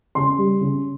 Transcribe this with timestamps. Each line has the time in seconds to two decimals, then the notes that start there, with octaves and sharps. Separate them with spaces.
0.15 C#3 C6
0.38 G3
0.61 C#3